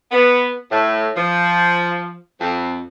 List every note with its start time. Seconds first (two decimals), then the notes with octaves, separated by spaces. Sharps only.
0.11 B3
0.70 A2
1.16 F3
2.39 F2